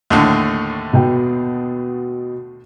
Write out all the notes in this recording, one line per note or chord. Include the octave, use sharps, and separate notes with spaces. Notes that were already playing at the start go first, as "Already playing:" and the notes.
D#2 A2 D3
B2 B3 G5